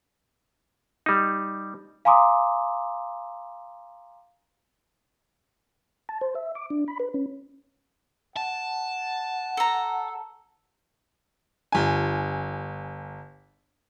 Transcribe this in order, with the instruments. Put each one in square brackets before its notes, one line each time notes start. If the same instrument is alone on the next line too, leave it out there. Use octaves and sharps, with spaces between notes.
[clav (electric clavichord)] G3 D#4
[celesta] F5 G#5 A#5 C6 D6 D#6
[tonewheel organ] A5
C5
E5
D6
D4
B5
B4
C#4
[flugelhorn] F#5 [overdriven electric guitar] A5
[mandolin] A4 A#5
[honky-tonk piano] G1 G#5